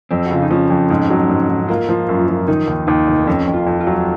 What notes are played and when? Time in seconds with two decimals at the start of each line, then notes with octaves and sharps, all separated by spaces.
0.11 F2 C4
0.26 F#4
0.31 C#3 F4
0.42 D#4
0.51 F3 C#4
0.70 F2
0.90 G#2
1.10 F#3
1.29 G#2
1.49 G#2
1.69 A#3 F4
1.89 F3
2.09 F#2
2.29 F3
2.48 D#3 D#4
2.67 D#2
2.87 D#2 D#4
3.07 F1
3.27 F2 C#4
3.47 F2
3.54 F4
3.67 F2
3.80 F4
3.87 F#3